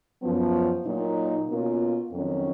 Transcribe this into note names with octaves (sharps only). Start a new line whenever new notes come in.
F#2 F3 B3
A#2 F#3 A#3 D#4
B2 A#3 C#4 F4
F2 D#3 F#3 C#4